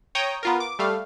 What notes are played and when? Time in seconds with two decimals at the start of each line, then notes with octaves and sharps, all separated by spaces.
0.15 C#5 G5 A#5 D#6
0.43 B3 F4 A#4
0.60 D6
0.79 G3 A3 F5